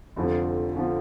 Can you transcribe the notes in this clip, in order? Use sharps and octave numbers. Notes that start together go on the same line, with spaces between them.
F1 F2 D3 F3
D3 F3